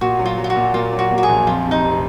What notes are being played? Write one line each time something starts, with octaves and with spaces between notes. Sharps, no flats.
A#2 F#4
F#3
F4
F#3
F4
F#4
A#2
A#3 F4
F#3
F#4
A#3
F#4
G#4
A#1
F2 F4
C3
D#4
F1